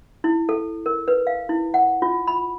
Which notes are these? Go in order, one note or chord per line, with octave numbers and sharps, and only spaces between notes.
E4
A4
A#4
B4
F5
E4
F#5
F4
B5